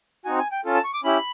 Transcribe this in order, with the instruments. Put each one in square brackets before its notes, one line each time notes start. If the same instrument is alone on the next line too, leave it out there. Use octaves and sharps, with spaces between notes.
[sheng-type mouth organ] C4 D#4 F#4 G#5
G#5
G5
C#4 F4 A4
A5
C#6
D6
C#4 E4 G4 B5